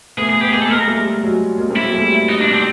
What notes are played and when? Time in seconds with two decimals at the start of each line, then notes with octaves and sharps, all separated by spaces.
0.17 A3 B3 G#4
0.29 G#4
0.40 B3 G4
0.52 G#3 A#3 G#4
0.62 A4
0.70 G#3 A#3 A#4
0.87 G3 A3
1.23 F#3 G#3
1.58 G#3 A#3
1.71 A#3 C4
1.76 E4
1.82 F#3 G#3
1.94 G3 A3
2.29 D#4
2.41 D4
2.53 C4